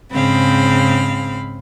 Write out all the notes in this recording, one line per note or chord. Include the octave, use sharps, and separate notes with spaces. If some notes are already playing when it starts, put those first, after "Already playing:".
G#2 C#3 C4 F5 B5